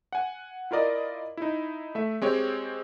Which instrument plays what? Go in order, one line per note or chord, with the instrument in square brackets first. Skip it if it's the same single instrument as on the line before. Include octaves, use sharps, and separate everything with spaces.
[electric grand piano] F#5 G#5
E4 F4 A#4 D5 D#5
D#4 E4
A3 E5
G#3 C4 G4 C#5